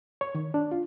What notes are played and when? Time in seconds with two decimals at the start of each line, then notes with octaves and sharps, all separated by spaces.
0.21 C#5
0.35 D#3
0.54 D4
0.71 F4